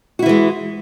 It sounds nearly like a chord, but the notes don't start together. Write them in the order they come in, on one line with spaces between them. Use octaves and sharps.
F#4 E4 E3 G#3